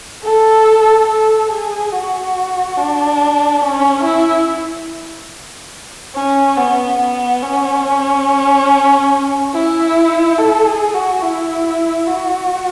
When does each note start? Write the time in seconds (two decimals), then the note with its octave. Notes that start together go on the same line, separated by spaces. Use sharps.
0.24 A4
1.08 A4
1.51 G#4
1.93 F#4
2.77 D4
3.62 C#4
4.04 E4
6.15 C#4
6.57 B3
7.00 B3
7.42 C#4
9.54 E4
10.38 A4
10.66 G#4
10.94 F#4
11.23 E4
12.07 F#4